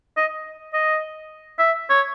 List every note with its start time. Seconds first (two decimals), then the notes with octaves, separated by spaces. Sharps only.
0.17 D#5
0.73 D#5
1.59 E5
1.90 C#5